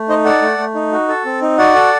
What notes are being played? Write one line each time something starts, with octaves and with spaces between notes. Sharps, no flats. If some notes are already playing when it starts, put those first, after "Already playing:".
Already playing: A3
D#4 C5 D#5
A4 D5 F#5
A3
A3
D#4
F#4
A4
C4
D#4
F#4 D5 F#5
A4